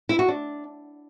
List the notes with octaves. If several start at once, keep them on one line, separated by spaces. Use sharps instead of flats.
E4
F#4
D4